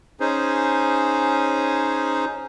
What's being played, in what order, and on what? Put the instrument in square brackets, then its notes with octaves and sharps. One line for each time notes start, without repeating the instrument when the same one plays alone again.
[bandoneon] C#4 D#4 G#4 C5